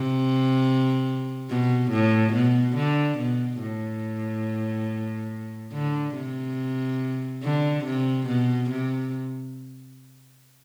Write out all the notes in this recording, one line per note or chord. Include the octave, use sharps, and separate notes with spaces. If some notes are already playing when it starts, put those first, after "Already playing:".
Already playing: C3
B2
A2
B2
D3
B2
A2
D3
C3
D3
C3
B2
C3